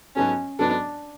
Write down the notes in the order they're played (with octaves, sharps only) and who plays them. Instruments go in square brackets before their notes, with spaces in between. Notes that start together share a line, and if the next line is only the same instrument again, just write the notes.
[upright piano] G#2 F#3 B3 F#4 A4 [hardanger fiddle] C#4
[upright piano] G#2 F#3 B3 F#4 A4 [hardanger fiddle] D4